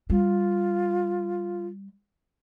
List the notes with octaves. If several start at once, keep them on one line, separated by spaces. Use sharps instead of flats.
G3 F4